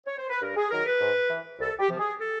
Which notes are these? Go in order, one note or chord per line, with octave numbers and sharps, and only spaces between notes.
C#5
C5
B4
G2 A#4
G#4
D#3 F#3 A#4
B4
G#2
E3
C2 A4
G4
C3 F3
G#4
A4